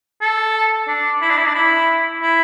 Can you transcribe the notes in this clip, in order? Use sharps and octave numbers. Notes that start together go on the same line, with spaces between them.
A4
D4
E4
D4
E4
D4
E4
E4